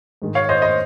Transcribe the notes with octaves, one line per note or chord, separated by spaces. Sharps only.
G#2 D#3 G#3
C#5 F5
C5 D#5
C5 D#5